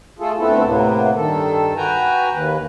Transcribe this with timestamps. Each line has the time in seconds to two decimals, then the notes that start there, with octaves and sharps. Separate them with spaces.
0.19 A3 F4 G#4 A4
0.38 D2 A3 B3 C4 E4 A4
0.63 A2 C3 A#3 B3
1.16 G2 D#3 A4
1.77 F#4 B4 G5 G#5 A#5
2.29 D#2 B4